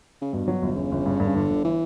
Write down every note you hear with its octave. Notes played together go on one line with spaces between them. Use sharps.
C#3
G2 B2
F#3
G1
G1 C#3
G1
G2
G2 D3
C#3
G1 D3
G1
E3